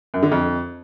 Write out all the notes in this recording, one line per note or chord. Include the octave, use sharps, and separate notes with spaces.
F#2
D3
F2